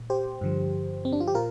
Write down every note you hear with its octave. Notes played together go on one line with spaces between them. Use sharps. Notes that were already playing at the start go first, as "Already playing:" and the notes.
Already playing: A#2
G4 C5
G2 D3 F3
C4
D4
F4
G4
A#2 F4 A#4